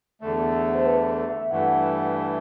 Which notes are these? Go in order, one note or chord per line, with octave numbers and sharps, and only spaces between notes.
E2 D3 A3
C5
B4
E5
E5
G2 E3 A3 F#5
E5